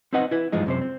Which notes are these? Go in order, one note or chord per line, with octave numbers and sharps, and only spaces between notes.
C4 D#4 B4 D#5 F#5
E4 B4
G2 E3 F3 G#3 D#4
F#2 C3 C5
C4